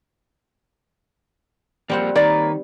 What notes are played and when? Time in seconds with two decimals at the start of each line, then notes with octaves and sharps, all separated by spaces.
1.89 F3 G3 A#3 C4 F#5
2.16 D#3 A#3 B4 C#5 D5